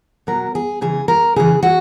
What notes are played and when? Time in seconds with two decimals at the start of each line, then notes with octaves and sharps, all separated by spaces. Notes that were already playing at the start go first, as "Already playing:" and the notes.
0.27 B2 F#3 A#4
0.55 G#4
0.81 C#3 E3 G#4
1.08 A#4
1.36 C#3 E3 G#4
1.63 F#4